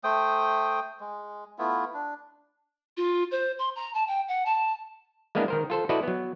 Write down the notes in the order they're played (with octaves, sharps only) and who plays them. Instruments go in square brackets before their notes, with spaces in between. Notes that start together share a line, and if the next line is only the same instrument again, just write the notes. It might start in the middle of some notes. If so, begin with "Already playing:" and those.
[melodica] A3 C5 G5 D#6
G#3
A3 B3 E4 F4
D4
[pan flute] F4
C5
C6
A#5
A5
G5
F#5
A5
[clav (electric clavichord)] G#3 A#3 B3 D4 E4 F5
D#3 A#4 C5
F4 A4 C5
E4 F#4 A4 B4 D5 D#5
F#3 B3